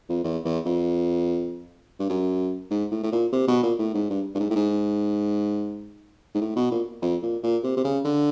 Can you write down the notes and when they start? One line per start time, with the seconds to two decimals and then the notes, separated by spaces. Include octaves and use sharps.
0.09 F2
0.24 E2
0.45 E2
0.65 F2
1.99 G2
2.09 F#2
2.70 G#2
2.91 A2
3.03 A2
3.12 A#2
3.32 C3
3.48 B2
3.63 A#2
3.79 A2
3.94 G#2
4.10 G2
4.35 G2
4.40 G#2
4.50 A2
4.56 G#2
6.34 G#2
6.41 A2
6.56 B2
6.71 A#2
7.02 F2
7.23 A#2
7.43 A#2
7.64 C3
7.77 C3
7.84 C#3
8.05 D3